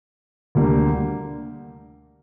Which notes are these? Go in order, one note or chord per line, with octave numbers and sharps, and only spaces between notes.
D2 D3 G3 A#3